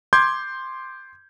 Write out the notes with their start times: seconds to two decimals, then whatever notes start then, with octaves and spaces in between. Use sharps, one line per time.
0.13 C6 D6 G6 G#6